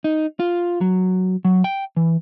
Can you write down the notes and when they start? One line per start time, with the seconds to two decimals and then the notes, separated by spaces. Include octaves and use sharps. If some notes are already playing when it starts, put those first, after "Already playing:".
0.04 D#4
0.40 F4
0.81 F#3
1.45 F#3
1.64 G5
1.97 E3